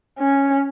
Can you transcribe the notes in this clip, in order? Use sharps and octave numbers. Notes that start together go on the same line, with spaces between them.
C#4